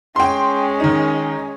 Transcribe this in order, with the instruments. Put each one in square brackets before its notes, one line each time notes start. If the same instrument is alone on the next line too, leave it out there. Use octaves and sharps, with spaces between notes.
[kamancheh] G#3 C#4 [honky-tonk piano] G5 C6
[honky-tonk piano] D#3 D#4